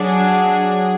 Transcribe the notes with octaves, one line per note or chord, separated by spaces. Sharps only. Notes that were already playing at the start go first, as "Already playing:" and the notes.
Already playing: F#3 D4 G#4 F#5